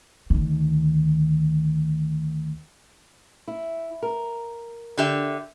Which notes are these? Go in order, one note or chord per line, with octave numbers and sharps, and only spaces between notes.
D2 D#3
E4
A#4
D3 G4 E5